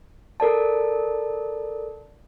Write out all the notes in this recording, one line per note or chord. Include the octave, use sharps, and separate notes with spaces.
A4 A#4 D5 A5